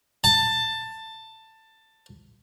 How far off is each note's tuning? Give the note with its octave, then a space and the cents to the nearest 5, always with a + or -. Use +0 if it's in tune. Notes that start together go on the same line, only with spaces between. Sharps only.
A5 +15